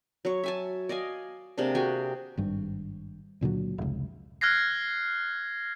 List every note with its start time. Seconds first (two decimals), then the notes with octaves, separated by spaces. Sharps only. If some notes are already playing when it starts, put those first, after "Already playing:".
0.25 F#3 C#5
0.44 E5 G#5 A5
0.89 D5 D#5 F5 G#5
1.58 C3 G#3 A#3 D4
1.75 F#4 G#4 G5 G#5
2.37 G#1 G2
3.41 C#2 A#2 D3 F#3
3.78 F1 C#2
4.41 F6 F#6 G#6 A#6 C7